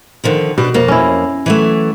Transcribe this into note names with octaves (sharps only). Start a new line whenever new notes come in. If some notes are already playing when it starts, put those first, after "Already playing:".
D3 D#3 F3
B2 D4 G4 B4
F2 A#3
C#4 E4
E3 F#3 A3